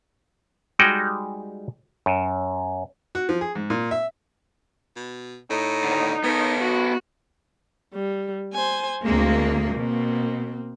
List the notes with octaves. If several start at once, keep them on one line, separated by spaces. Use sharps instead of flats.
G3 G#3 D#4 F#4 F#5 G5
F#2
F#4
F3
G#4
G#2
A#2
E5
B2
A2 D#4
D#2 D3
D#3 B3 A4
F#4
G3
C5 G#5
D2 G#3 A#3 C4
B2 A#3 C4